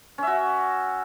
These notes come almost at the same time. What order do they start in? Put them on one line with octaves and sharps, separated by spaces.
C#4 E5 F#4